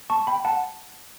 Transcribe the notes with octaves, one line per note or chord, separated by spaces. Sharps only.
A5 C#6
G5 B5
F#5 A5